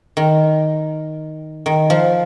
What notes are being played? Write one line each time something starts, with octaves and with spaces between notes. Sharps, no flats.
D#3
D#3
F3